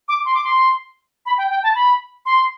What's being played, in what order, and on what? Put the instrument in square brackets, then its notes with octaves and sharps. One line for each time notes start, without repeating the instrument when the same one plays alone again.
[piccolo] D6
C6
D6
C6
B5
G5
G5
A5
B5
C6